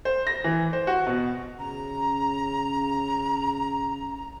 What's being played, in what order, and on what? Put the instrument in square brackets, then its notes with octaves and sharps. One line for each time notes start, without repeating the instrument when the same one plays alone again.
[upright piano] C5
A#6
E3
C5
F#4
B2
[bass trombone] C#3 [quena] A#5